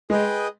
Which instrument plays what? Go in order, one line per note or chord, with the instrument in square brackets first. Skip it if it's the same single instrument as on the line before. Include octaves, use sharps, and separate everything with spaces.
[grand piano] G#3 [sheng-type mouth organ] G#4 B4 D#5 G5